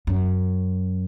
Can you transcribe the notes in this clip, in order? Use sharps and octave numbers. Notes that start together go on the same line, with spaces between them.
F#2